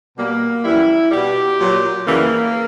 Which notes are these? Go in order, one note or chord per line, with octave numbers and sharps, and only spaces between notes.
B2 G3 A#3
F#2 E3 G3 E4
B2 G3 G4
A#2 F#3
F#2 C#3 E3 G3 A#3